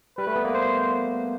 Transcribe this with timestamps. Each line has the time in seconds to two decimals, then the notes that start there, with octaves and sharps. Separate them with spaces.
0.18 G3 B4
0.27 A3
0.36 B3
0.45 A#3
0.54 C5